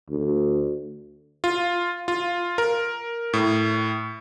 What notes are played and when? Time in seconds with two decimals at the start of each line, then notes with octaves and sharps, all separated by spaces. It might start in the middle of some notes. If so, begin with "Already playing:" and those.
0.10 D2
1.44 F4
2.08 F4
2.58 A#4
3.33 A2